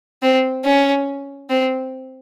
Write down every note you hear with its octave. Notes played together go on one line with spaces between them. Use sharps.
C4
C#4
C4